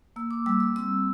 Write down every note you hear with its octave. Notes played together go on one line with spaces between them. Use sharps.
A#3 E6
D6
G3 E6
E6
C4 E6